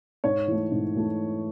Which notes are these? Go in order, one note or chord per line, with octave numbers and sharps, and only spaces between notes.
G#2 C#5
E3 A3
G#2
E3 A3